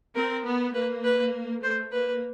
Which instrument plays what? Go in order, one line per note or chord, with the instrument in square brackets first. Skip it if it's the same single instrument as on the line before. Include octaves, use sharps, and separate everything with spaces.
[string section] C4 [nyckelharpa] A#4
[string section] B3
[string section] A#3 [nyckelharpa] B4
[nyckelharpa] B4
[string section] A3 [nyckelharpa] C5
[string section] A#3 [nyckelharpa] B4